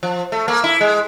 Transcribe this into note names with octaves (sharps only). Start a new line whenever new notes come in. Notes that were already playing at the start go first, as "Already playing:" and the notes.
F3
A3
A#3
E4
G#3